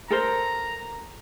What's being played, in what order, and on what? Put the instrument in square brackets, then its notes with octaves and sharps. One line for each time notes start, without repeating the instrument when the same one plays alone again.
[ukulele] A4 A#4 C5 [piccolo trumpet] A#5